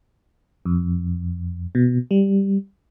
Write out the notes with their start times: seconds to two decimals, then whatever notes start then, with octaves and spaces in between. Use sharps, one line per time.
0.65 F2
1.75 B2
2.11 G3